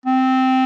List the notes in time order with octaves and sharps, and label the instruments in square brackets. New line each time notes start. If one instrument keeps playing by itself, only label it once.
[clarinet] C4